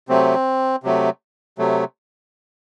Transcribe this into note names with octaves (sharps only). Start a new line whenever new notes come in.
C3 F#3 A3 C4
C3 F#3 A3
C3 F#3 A3